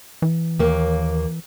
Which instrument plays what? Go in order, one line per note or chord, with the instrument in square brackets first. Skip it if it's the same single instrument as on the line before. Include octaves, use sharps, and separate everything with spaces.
[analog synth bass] E3
[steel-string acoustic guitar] D#2 A#3